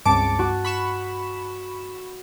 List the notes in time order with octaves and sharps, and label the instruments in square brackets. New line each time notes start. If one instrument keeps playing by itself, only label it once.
[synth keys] C#2 D6 [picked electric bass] G2 C4 [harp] A5 C#7
[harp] F#4
[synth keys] B5 C#6 E7